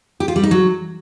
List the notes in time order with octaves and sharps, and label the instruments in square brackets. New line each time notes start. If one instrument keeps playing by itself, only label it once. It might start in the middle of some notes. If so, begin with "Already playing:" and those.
[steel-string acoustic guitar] G4
F4
G3
D#4
F#3